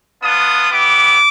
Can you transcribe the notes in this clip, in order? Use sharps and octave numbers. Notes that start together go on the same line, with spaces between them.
B3 D4 F4 D#6
B3 E4 G4 D6